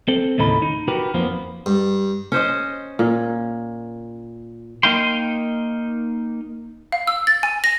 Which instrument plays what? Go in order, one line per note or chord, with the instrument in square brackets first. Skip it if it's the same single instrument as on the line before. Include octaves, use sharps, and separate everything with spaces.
[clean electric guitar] C4 A4
D#2 A2 C#3 D#4 A4 B5
D#4
D#4 F#4 G4 A#4 B4
F2 F3 A#3 B3
[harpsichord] G2
[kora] C#4 C5 D#5
A#2
[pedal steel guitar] A#3 D#4 F5 G5 C6
[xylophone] F5
E6
A6
G#5
A#6